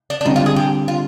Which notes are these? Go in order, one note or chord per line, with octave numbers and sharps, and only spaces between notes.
D4
D4
D3 G3 C4 D#4
F4
G#4
G4
F4